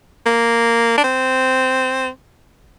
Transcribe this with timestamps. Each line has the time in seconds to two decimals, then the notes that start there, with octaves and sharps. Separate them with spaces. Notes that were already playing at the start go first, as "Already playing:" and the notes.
0.26 A#3
0.98 D4
1.04 C4